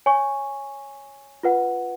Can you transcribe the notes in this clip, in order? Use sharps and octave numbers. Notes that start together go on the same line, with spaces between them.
C#5 G#5 C#6
F4 B4 F#5